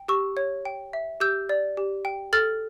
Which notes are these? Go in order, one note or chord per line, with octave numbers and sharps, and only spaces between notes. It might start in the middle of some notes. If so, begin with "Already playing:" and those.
Already playing: G5
G4 C#6 E6
C#5
G5
E5
G4 E6 G6
D5
G4
G5
A4 F6 A6